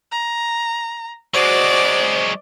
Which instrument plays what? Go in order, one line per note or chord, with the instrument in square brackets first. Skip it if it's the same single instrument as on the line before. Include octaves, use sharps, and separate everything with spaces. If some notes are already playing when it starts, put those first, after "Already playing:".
[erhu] A#5
[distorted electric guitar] F#3 G#3 [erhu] F#4 [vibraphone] C5 [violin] D5